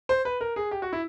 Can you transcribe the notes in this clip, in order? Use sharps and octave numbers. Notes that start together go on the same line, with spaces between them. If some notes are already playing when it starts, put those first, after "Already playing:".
C5
B4
A#4
G#4
G4
F#4
E4